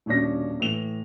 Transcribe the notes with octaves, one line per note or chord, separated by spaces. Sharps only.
D#1 B2 C#4 D4 C#5 A#6
A2 E3 F7